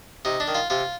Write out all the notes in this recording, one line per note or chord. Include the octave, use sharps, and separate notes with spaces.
C3 D#4
D4
D#3
F4
C3 F4